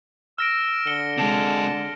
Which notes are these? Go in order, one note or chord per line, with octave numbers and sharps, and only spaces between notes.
E6 F6 A#6 D7
D3 C#7 D7 G7
C3 G#3 A5